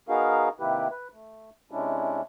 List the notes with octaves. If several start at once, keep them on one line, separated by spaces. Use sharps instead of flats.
B3 D#4 F#4 G#4 A#4 F5
C3 D#3 A#3 E4 G4 B4
B4
A3
C3 G#3 C#4 D4 E4